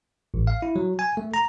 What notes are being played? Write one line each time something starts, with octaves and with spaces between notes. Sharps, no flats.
A1
F5
E4
F#3
G#5
A3
A#5